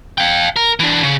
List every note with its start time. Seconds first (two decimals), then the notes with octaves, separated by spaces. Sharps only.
0.18 F5 G5
0.56 A#4
0.79 E3 D4
1.03 C#3